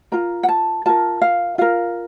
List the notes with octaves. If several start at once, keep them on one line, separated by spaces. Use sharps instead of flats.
F4 A#4 A#5
F#5
A5
F4 A#4 A5
F5
F4 A#4 F5